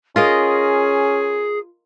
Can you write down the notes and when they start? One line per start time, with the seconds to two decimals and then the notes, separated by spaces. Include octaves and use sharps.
0.16 C#4 F4 G#4 A#4 D#5